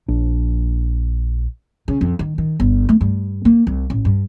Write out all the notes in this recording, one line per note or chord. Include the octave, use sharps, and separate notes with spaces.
A#1 D4
C#3
F2
D#3
D#3
G1
A3
G2
A#3
C2
A1
G2